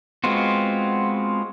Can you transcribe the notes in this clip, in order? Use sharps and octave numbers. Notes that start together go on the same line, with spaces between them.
G#3 B3 C4 F4 F#4